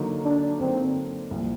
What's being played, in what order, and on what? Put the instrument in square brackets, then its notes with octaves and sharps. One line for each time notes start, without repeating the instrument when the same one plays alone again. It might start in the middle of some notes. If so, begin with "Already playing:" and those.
Already playing: [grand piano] D3 F#3 A#3 D#4
[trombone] D4
[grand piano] D3 F#3 A#3 D#4 [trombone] C4
[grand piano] C2 A#2 F3